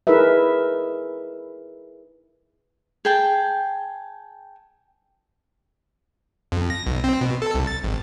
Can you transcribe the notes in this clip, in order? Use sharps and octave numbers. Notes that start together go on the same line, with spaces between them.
D#4 E4 G#4 A#4 B4 E5
G#4 G5 A5
F2
A#6
B1
C4
B2
A4
C2
A6
G#1